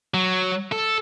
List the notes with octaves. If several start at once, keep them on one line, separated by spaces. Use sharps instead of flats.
F#3
A4